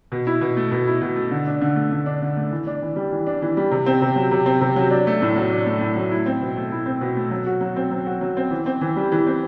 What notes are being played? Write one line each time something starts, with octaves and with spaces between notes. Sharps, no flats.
B2
E4
B2
A3
B2
E4
B2
A3
D3
D4
D3
A3
D3
D4
D3
A3
E3
D4
E3
G3
E3
D4
E3
G3
C3
C4
C3
F#3
C3
C4
C3
F#3
D4
A3
A2
F#3
D4
A3
A2
F#3
E4
C4
B2
A3
E4
C4
B2
A3
F#3
F#4
F#3
C4
F#3
F#4
F#3
C4
E3
C4
E3
G3
E3
C4